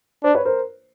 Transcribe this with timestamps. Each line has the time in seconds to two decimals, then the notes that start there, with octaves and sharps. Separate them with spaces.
0.24 D4 C5 D5
0.35 B4 C#5
0.45 A#4 C5